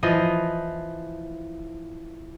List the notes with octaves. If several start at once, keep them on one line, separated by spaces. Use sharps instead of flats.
E3 F3 D#5